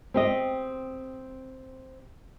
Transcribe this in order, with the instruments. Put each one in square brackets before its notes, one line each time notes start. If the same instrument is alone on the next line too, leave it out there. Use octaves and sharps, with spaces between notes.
[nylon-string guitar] C4 G4 D#5